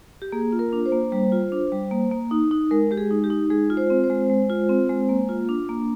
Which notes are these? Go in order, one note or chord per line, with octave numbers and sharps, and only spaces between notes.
G4
A#3 G#4
F4
A#4
D4
C5
A#3
G3
F4
D4
G3
A#3
A#3
D#4
D#4
G#3 A#4
G#3 G4
G#4
D#4
G4
D#4
G#3 G#4
F4
C5
C4
C5
G#3
G#3
F4
C4
G#3
A#3
F4
D4
A#3